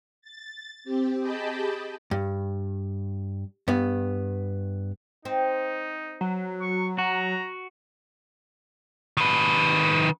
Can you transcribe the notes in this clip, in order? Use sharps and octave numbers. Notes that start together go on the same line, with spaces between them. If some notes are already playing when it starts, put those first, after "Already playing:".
A6
C4 G4
G4 G#4 D#5 G5 A5 B5
G2
G2 B3
C4 D#4
F#3
C#6
F#4 A#5
D#3 B4